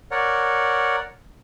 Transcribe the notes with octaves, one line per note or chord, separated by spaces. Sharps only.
A#4 C#5 D5 F#5